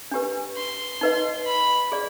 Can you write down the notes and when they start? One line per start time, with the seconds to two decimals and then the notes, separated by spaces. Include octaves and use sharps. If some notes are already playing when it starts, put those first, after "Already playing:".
0.11 D4 G4 B4
0.57 C6
1.01 D#4 B4 D#5
1.46 B5
1.92 G#4 D5